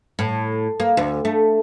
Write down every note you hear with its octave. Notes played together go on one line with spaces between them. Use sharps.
A2
A#3
D2
A3